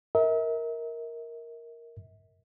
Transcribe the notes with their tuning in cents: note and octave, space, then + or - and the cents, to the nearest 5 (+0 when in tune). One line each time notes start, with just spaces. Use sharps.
A#4 +0 E5 -45